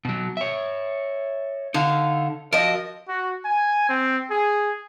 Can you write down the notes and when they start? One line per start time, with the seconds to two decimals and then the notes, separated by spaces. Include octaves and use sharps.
0.05 B2 F#3
0.37 C#5 E5
1.74 D3 D#4 F5
2.53 F3 F#4 A#4 D#5
3.08 F#4
3.45 G#5
3.89 C4
4.30 G#4